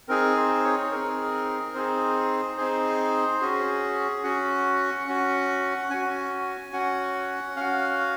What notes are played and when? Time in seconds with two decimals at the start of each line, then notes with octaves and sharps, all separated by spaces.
0.09 C4 D#4 G#4 A#4
0.36 C5
0.64 C#5
0.91 C4 D#4 G#4 A#4
1.74 C4 D#4 G#4 C5
2.57 C4 D#4 G#4 C5
3.41 C#4 F#4 G#4
4.24 C#4 F#4 F#5
5.07 C#4 F#4 F#5
5.90 C#4 F#4 G#5
6.73 C#4 F#4 F#5
7.56 C#4 F#4 F5